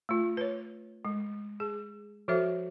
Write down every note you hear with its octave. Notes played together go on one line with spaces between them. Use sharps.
A3 F4
B4 C#5
G#3
G#4
F3 F#4 A4 C5 E5